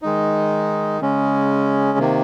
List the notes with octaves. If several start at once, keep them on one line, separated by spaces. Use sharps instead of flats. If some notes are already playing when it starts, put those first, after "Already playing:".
D#3 G#3 D#4
C#3 G#3 C#4
C3 D#3 A#3